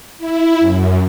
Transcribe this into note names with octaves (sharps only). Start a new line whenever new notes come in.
E4
F#2